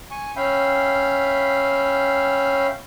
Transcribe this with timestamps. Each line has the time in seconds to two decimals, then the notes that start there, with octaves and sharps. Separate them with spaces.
0.11 G#5 C#6
0.36 C#4 E5 F5 G5 B5